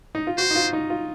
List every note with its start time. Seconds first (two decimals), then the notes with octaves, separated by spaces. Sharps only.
0.15 D#4
0.27 F4
0.38 F#4 C5
0.51 D#4
0.55 F4
0.73 D#4
0.90 F4